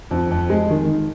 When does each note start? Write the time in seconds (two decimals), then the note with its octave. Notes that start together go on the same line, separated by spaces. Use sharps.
0.11 F2
0.31 F2
0.50 G#3
0.70 D#3